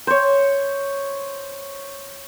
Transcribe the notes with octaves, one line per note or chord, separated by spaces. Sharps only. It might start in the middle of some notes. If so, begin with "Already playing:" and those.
C5 C#5